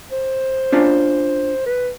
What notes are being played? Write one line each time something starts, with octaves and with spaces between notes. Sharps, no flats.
C5
C#4 D4 F4
B4